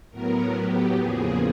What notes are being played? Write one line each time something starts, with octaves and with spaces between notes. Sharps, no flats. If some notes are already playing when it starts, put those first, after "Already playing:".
A2 F#3 B3 A#4
G4
E2 C#3 F3 A#3 G#4